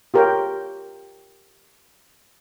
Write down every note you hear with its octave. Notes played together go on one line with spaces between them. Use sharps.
F4 G4 A#4 C#5 G5